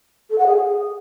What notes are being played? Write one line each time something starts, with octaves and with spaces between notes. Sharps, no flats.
A4
F#5
G#4